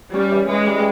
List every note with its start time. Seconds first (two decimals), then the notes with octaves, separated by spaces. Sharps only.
0.14 G3 C#4
0.31 E3
0.48 E3 G#3
0.66 G3